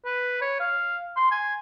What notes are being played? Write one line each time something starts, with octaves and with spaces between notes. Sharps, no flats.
B4
C#5
F5
C6
G#5